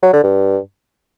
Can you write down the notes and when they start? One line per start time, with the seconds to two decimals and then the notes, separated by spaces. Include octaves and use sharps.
0.03 F#3
0.13 D3
0.24 G2